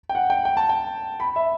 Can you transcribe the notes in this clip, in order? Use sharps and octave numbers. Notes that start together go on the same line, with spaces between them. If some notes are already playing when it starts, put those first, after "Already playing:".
G5
F#5
G5
G5
A5
G5
B5
E5